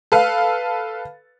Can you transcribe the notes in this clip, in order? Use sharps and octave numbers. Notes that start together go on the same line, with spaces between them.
A4 B4 F5